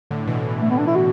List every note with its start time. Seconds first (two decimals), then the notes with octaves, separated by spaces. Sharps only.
0.11 A2 D3
0.27 B2 E3
0.61 A3
0.70 B3
0.78 D4
0.87 E4
0.95 F#4